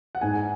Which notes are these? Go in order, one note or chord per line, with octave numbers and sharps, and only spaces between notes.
F#5
G#2 G#5